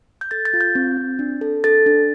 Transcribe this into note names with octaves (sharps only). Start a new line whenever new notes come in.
G6
A4 A6
A6
F4
G6
C4
C4
D4
A4
A4 A6
D4